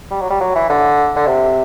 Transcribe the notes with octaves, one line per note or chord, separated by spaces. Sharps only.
G3
F#3
G3
F#3
E3
D3
D3
C3